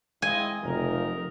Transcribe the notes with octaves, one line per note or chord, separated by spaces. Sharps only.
G#3 C4 E4 D#5 G#5
F1 C#3 F3 F#3 D#4 A#4